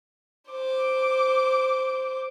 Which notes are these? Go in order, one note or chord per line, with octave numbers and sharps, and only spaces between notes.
C5 D6